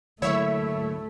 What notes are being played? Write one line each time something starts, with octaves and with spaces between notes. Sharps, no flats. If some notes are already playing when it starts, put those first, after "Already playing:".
D3 F#3 A3 A#3 E4 C#5 E5